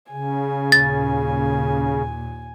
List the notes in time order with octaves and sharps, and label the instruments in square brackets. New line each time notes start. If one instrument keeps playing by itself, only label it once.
[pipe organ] C#3 [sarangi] G#5
[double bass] D#2 A#2 [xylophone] A6